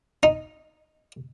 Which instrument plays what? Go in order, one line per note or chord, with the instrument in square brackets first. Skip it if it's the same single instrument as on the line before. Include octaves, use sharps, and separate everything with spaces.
[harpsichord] D#4